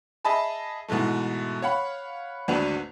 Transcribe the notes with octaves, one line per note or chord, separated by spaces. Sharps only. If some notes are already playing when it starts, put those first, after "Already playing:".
G#4 D#5 E5 A5 B5
G#2 B2 E3 G#3 A3
C#5 F5 F#5 B5
G#1 D2 D4 F#4 B4 F7